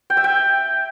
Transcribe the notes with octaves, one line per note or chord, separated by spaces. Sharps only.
G5
E5
G5